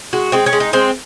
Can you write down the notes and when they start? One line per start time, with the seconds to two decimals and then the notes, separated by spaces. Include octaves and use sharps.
0.13 G#3 F#4
0.32 G#3 C4
0.46 C#4
0.53 G#3
0.60 D#4
0.73 G#3 C4